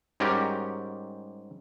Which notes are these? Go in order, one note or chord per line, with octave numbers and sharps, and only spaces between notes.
G#2 G3 C#4 F#4 G4 A#4